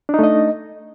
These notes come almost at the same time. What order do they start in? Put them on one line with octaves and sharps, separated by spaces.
D4 D#4 A3 D#5